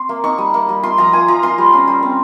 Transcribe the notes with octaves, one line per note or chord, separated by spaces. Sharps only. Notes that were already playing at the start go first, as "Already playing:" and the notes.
Already playing: C4 C6
A#3
D#4 C#6
G3
A#3
G3
F4 C6
F3 A#5
A#3 G#5
F3 A#5
F4 C6
G3
C#4
G3
C4